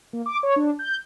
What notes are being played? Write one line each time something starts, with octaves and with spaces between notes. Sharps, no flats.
A#3
D6
C#5
D4
G6